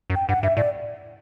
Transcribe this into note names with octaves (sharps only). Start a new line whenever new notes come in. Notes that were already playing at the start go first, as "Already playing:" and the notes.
F#2
G5
G2 F#5
G2 E5
A2 D5